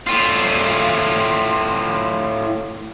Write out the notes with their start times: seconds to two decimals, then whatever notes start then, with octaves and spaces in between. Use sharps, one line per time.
0.07 A2 F4